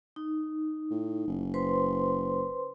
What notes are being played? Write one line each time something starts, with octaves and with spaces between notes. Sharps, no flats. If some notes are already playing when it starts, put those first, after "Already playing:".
D#4
A2
F#1
B4 C5 C6